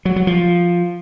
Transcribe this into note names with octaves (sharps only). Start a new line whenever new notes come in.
F#3
F#3
F3